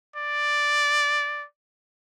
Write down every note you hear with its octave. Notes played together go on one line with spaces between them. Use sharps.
D5